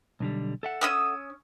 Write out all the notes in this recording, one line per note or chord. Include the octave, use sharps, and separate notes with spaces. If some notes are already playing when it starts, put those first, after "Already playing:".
B1 D3 G3
A4 E5 F#5
C#4 D#6 E6